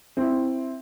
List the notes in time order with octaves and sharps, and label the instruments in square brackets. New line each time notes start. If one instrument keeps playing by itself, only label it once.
[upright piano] C4 E4